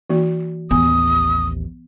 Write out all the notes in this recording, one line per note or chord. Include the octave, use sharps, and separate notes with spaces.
E3 A#3 F#4
A1 D#2 B3 D#6